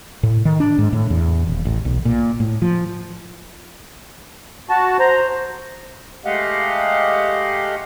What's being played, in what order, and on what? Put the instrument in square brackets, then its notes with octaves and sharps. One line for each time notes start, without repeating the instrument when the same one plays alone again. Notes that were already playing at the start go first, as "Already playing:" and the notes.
[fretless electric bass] A2
D#3
D4
G#2
A2
E2
D#1
A1
B1
A#2
A2
F3
[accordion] F#4 A5
[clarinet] C5 [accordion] A#5
[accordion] G#3 A3 G4 D#5 F5 F#5